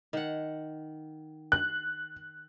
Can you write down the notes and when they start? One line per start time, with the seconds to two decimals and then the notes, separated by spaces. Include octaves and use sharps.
0.13 D#3 F#5
1.52 F#6